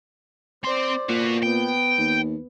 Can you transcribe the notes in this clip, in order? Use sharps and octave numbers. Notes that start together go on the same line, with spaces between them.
C4 C5 D5 C6
A#2 F#4 B4
B3 G5
D#2